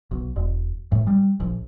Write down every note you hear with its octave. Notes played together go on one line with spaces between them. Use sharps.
B1
E1
A2
G3
A#1